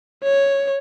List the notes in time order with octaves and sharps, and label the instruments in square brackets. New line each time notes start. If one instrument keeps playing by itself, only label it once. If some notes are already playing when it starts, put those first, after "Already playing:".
[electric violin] C#5